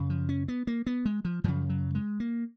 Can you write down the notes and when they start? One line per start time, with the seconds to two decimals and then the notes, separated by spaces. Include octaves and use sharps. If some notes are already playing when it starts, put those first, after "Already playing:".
Already playing: F#2 C#3
0.10 F3
0.29 C#4
0.48 B3
0.67 A#3
0.87 B3
1.05 G#3
1.25 F3
1.44 F#2 C#3 F3
1.69 F#3
1.95 G#3
2.20 A#3